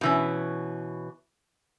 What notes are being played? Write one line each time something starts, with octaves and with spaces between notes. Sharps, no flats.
B2 E3 C#4